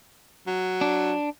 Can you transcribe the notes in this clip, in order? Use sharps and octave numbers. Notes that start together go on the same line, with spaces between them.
F#3
D4